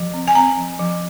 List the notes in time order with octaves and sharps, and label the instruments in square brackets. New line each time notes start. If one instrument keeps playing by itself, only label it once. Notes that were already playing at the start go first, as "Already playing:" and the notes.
Already playing: [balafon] F3
C4
G#5
C4 A#5
F3
F3